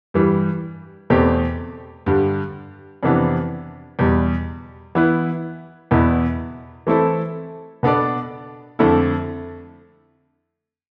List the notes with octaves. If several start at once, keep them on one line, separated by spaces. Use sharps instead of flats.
G2 E3 G3
E2 B2 A3 C4 G4
G2 D3 G3
F2 C3 E3 B3 D4
E2 B2 G3
E3 B3 E4 B4
E2 B2 B3 E4
E3 A3 C4 E4 A4
B2 B3 D4 A4 D5
F2 D3 A3 E4 A4